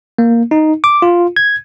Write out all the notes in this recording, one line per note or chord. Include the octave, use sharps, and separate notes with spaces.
A#3
D#4
D6
F4
G#6